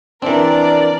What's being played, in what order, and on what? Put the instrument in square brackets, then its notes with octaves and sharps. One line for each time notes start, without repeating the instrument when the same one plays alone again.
[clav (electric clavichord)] E3 C4 [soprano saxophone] D4 [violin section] A#4 D5